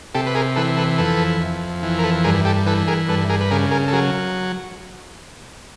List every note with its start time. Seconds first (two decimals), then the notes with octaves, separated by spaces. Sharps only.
0.14 C3 G4 A4
0.26 B4
0.35 G#4 A#4
0.56 E3 A4 B4
0.77 A4 B4
0.98 F2 A4 B4
1.41 F2
1.83 E3
1.99 A#4
2.04 A4 B4
2.24 G2 G#4 A#4
2.45 G4 A4
2.67 E3 A4 B4
2.87 G#4 A#4
3.08 G2 A4 B4
3.29 G#4 A#4
3.41 B4
3.51 C#3 G#4 A#4
3.71 G#4 A#4
3.88 A4
3.93 F#3 G#4 A#4